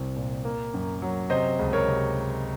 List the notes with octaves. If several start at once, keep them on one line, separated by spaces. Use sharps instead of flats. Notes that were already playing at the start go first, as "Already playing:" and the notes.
Already playing: C2 C3 C4
A#2
A#3
F#2
F#3
C3 C5 D#5
C#2
A#4 C#5
C3